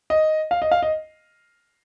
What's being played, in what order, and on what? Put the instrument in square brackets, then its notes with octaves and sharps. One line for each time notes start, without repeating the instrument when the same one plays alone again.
[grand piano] D#5
F5
D#5
F5
D#5